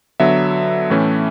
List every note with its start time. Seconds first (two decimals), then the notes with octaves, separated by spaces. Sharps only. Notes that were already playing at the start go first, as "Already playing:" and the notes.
0.20 D3 F#3 B3 E5
0.90 A2 E3 A3 C#4